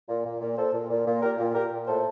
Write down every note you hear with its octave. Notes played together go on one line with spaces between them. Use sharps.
A#2
A#2
A#2
A#2 A4 C5
A#2
A#2
A#2
A#2 G4 A#4
A#2
A#2 G4 A#4
A#2
A2 A4 C5